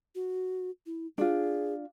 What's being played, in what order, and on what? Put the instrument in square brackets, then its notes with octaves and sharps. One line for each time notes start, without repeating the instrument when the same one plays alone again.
[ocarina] F#4
E4
[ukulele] D4 F4 [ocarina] G#4